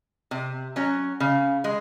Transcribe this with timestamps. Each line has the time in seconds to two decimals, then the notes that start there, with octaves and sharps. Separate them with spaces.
0.31 C3
0.76 F#3 C#4
1.20 C#3
1.64 G#3